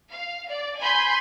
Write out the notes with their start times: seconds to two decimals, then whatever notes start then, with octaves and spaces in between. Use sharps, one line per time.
0.12 F5
0.50 D5
0.80 G#5 B5 C6 G6